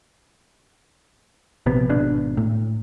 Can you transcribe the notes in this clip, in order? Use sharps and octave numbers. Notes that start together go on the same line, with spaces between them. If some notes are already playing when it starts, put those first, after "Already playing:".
A#1 C3 B3
G#1 B2 D4
A2